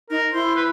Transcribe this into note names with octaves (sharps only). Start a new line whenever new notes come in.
D#4 A#4
E4 C5
B4